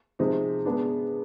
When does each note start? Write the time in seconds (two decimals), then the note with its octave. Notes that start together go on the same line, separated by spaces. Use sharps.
0.19 C3 F3 G#3 C4 D#4
0.65 G#3 B3 D4